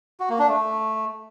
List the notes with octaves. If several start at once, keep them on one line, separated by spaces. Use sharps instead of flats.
F#4
A#3
D4
A3